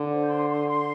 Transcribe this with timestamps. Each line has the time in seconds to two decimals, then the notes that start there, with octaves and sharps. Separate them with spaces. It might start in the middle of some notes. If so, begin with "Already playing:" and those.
Already playing: D3
0.12 C5
0.30 C6
0.49 C6
0.68 C6